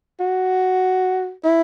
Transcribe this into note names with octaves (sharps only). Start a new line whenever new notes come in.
F#4
E4